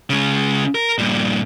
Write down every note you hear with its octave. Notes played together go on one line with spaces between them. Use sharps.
C#3 G#3
A#4
G2 A#2